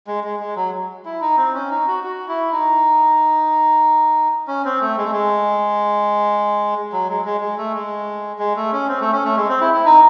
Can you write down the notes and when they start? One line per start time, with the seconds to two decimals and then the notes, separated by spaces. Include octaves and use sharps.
0.07 G#3
0.24 G#3
0.40 G#3
0.56 F#3
1.05 E4
1.21 D#4
1.37 C4
1.55 C#4
1.71 D#4
1.87 F#4
2.04 F#4
2.28 E4
2.52 D#4
4.47 C#4
4.65 C4
4.81 A3
4.97 G#3
5.04 A3
5.12 G#3
6.93 F#3
7.09 G#3
7.25 G#3
7.41 G#3
7.58 A3
7.74 G#3
8.39 G#3
8.56 A3
8.72 C#4
8.88 C4
9.00 A3
9.12 C#4
9.25 A3
9.36 G#3
9.49 C4
9.61 E4
9.74 E4
9.85 D#4